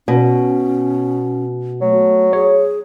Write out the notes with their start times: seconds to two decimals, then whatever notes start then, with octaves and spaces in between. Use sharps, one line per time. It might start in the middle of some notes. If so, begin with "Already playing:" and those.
0.08 B2 C#4
1.81 F#3 A3
2.33 G#4 C#5